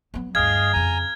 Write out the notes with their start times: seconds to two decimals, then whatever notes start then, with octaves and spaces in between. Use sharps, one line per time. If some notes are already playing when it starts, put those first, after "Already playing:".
0.14 F#3 B3
0.35 D2 G2 G#4 D#5 F5 F6 G#6
0.73 F2 C#3 G#5 A#5